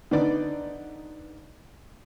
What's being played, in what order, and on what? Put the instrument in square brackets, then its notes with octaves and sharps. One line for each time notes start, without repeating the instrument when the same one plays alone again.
[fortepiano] D3 B3 D#4 D5